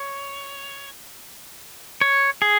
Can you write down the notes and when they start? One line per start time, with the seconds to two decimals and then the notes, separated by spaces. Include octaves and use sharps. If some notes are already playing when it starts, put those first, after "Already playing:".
Already playing: C#5
2.01 C#5
2.42 G#4